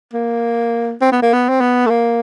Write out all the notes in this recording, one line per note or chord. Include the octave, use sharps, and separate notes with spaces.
A#3
C4
B3
A#3
B3
C4
B3
A3
A#3